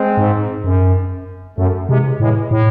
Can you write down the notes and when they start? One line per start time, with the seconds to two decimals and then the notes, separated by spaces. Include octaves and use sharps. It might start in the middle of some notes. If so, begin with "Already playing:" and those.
Already playing: G#3 C4
0.17 G#2
0.64 F#2
1.57 F#2 F#3 A3
1.89 C3 E3 G#3
2.20 A2 E3 G#3
2.51 A2